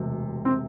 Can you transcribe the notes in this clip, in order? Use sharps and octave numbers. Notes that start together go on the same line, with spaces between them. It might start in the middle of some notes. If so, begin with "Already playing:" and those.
Already playing: E1 D2 C3
C4